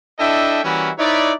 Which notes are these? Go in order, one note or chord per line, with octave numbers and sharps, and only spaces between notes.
D4 E4 A4 D#5 E5 G5
E3 G3 A#3 C#4 E4 F#4
D#4 E4 B4 C#5 D5